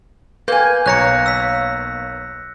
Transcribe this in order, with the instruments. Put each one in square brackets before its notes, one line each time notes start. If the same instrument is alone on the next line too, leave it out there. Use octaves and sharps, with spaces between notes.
[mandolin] A#3 G#5 [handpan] B4 [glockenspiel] G6
[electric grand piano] B1 C#5 A#5 [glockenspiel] F#6 A#6 C#7
[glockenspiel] E6 B6